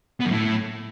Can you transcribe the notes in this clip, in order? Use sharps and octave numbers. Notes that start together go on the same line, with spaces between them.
B3
F#2
A2